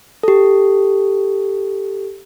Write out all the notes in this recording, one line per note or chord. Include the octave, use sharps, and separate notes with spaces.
G4 A4